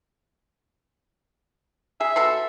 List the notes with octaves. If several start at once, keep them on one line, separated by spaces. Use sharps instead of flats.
G#4 E5
B2 A4 C6